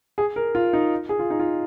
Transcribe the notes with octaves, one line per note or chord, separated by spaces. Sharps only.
G#4
A#4
F4
D#4
G#4
F4
D#4
F4